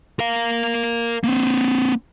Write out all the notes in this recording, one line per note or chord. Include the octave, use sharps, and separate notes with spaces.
A#4 F5
A#3 C4